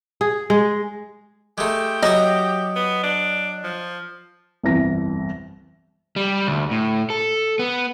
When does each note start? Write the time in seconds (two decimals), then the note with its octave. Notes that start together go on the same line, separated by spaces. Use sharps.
0.21 G#4
0.50 G#3
1.58 G#3 A3 G4
2.03 F#3 D#5 E5 D6
2.76 B3
3.03 D4
3.64 F3
4.63 G1 C2 F2 E3 A#6
6.16 G3
6.47 D2
6.71 A2
7.10 A4
7.59 B3